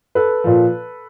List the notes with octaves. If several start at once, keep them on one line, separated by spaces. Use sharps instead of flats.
A4 B4
A#2 F3